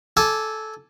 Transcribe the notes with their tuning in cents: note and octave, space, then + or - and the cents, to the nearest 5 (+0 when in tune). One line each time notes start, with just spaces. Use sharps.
A4 -15 G#5 +0 D6 +0